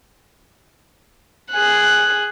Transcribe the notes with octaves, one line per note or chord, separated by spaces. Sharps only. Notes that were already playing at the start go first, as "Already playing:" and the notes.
G#4 F#6